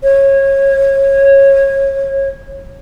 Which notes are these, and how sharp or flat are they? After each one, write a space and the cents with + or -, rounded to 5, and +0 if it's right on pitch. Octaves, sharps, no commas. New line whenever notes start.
C#5 -25